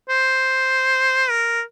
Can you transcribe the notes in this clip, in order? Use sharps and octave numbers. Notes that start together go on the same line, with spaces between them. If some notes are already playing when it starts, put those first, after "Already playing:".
C5
A#4